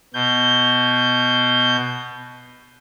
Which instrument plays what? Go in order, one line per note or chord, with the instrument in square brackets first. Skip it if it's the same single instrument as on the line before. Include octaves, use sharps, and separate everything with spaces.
[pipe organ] B2 G6